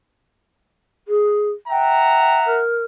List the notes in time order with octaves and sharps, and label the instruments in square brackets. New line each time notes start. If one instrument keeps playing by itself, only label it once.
[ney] G#4
[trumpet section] E5 F#5 A#5 [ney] G5
[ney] A#4